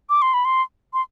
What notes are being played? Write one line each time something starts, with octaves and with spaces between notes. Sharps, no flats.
D6
C6
B5
C6
C6